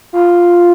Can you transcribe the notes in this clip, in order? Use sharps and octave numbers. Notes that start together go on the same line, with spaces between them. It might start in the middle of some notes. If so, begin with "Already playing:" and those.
F4